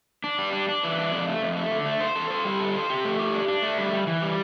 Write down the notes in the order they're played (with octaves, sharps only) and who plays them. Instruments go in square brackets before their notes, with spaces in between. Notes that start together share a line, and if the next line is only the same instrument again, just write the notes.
[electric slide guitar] D4
G3
D4
D4
E3
D4
F2
A3
F2
A3
D3
A3
C5
A4
C5
G3
A4
C5
G4
A3
G4
D4
D4
A3
G3
G3
E3
G3